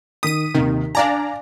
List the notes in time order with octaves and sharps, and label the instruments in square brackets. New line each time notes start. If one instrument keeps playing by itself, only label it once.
[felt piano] D#3 B6 [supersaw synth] D#6 D#7
[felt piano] D#2 C3 [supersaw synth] D#3
[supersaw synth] D4 D5 A#5 [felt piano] F5 G#5